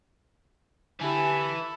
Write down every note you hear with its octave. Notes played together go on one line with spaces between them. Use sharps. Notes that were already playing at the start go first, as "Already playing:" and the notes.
D3 E3 E4 G4 A4 G#5